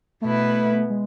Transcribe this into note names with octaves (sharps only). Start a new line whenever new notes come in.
B2 A3 B3 E4 B4
G#3